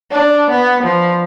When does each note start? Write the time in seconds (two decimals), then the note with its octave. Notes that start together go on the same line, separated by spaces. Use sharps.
0.12 D4
0.51 B3
0.83 F3